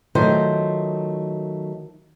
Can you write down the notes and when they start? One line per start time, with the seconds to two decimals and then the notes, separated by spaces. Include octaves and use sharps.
0.15 D#3 F#3 A3 F4 C5